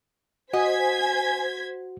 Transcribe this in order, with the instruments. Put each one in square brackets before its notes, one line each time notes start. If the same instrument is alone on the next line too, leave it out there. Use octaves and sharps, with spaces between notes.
[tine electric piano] F#4 F#5 [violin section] C5 G#6 B6 [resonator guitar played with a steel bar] D#5 [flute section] G#5